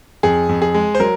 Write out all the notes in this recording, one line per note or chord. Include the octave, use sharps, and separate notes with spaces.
F2 G#4
F2
G#4
G#3
C5
F#3 A#4